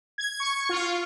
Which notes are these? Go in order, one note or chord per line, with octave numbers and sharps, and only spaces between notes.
G#6
C#6
F4